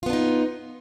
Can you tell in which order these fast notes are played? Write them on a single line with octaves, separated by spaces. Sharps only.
F4 B3 D4 D#4